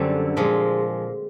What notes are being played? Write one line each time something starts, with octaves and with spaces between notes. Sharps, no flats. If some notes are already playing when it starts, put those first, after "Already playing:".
Already playing: F#2 D3 G3 A3 C4
A#2 F3 G#3